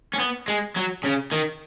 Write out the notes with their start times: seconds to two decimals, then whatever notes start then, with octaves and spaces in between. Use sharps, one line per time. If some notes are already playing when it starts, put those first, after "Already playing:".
0.14 C#4
0.20 B3
0.48 G#3
0.77 F#3
1.05 C#3
1.32 D#3